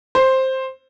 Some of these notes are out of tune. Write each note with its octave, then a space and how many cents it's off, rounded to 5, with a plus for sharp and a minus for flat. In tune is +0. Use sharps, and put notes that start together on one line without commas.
C5 +5